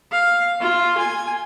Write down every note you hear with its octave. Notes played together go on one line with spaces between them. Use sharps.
F5
F4
G#5